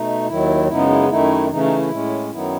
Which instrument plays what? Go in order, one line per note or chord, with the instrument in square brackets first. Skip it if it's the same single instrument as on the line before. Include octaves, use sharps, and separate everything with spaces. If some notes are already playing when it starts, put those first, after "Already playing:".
Already playing: [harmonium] B2 A3 D#4
D#2 D#3 F#3 E4
F#2 C#3 G#3 B3 D#4 E4
E4
F#2 D#3 A3 D#4 E4
C#3 E3 A3 C#4 D#4
D#4
E4
A2 G#3 C#4
F#2 D#3 F#3 B3 D#4 E4